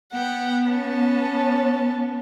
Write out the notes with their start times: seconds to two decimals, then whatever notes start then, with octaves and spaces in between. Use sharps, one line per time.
0.13 B3 F#5 G5
0.70 C#4 A5